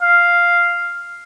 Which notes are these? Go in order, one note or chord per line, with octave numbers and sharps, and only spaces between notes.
F5